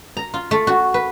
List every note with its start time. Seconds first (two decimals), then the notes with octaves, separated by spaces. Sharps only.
0.17 A#5
0.34 F4
0.51 A3
0.67 F#4
0.94 B4